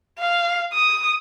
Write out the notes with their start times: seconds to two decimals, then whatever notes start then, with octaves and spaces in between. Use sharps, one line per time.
0.19 F5
0.73 D#6